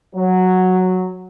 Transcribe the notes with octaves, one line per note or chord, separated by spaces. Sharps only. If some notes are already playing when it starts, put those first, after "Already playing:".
F#3